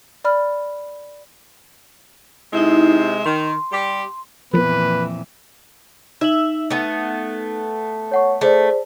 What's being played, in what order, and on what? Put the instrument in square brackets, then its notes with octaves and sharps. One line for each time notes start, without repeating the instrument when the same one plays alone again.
[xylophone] D5 B5 F6
[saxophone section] C3 G#3 E5 [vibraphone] D#4 E4
[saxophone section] D#3 [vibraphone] C6
[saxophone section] G3 G4
[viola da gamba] F2 A#2 E3 [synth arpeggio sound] F3 A#3 B3 [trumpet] B4
[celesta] D#4 F#7 [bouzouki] E5
[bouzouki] A3 B3
[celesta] C#5 F#5 C#6
[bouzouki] A3 [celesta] G#4 C5 D5